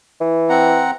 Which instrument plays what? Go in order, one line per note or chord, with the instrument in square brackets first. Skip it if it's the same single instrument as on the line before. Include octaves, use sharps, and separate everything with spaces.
[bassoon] E3
[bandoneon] C4 F#5 A#5